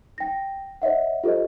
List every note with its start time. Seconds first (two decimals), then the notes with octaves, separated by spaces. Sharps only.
0.18 G5 A#6
0.82 C#5 D#5 E5 F#5
1.24 F4 G4 A4 C5 D#5